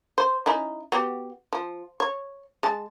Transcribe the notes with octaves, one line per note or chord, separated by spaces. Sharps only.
C5
C#4 D#4 E4
B3 F#4 G4
F3
C#5
G#3 A5